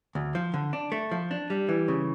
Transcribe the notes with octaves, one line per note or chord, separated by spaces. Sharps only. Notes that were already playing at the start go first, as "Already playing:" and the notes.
D2
F3
D3
D4
A3
F3
D4
G3
E3
C#3